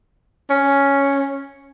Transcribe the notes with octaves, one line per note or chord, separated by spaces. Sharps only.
C#4